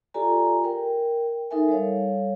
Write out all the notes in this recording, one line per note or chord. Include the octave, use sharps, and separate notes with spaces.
F4 G4 A4 D5 G#5 A#5
A#4 G5
D#4 A4 A#4 E5 G#5
G3 A4 C#5 F5